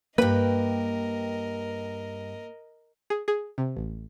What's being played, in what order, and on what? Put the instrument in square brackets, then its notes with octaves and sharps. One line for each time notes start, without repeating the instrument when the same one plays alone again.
[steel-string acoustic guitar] G2 G5 [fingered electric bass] A#3 [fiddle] A#4 D#5 [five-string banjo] B4
[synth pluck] G#4
G#4
C3
A1